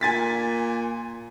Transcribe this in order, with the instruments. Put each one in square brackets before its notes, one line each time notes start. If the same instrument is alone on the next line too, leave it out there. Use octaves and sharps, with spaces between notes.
[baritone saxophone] A#2 [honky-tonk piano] G#5 A6 B6